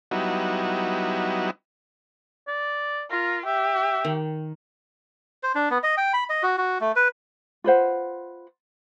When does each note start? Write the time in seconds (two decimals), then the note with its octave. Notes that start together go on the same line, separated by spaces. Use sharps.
0.11 F#3 G3 B3 D#4 E4 F#4
2.47 D5
3.11 F4 A#4
3.46 G4 E5
4.04 D#3
5.43 C5
5.55 D4
5.70 B3
5.83 D#5
5.97 G5
6.13 B5
6.30 D#5
6.43 F#4
6.58 F#4
6.81 A3
6.96 B4
7.64 F4 B4 C5 F#5